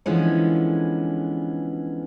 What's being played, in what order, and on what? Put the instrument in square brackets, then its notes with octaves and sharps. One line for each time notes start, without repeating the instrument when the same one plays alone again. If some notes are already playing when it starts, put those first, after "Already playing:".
[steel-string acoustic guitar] D3 E3 F3 G#3 B3 C#4